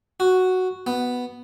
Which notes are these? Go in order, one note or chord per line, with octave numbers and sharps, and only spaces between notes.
F#4
B3